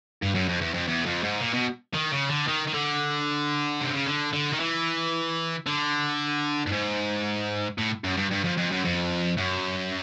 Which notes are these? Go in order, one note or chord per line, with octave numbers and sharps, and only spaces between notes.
G2
F#2
F2
E2
F2
E2
F2
G#2
A#2
B2
D#3
C#3
D3
D#3
D#3
D3
C3
C#3
D3
D3
D#3
E3
D3
G2
G#2
A2
F#2
G2
G2
F2
F2
F#2
F2
F#2